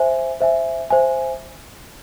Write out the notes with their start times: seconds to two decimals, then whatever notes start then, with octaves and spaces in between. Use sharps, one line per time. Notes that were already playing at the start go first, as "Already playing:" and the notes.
Already playing: C5 E5 G#5
0.41 C5 E5 G#5
0.90 C5 E5 G#5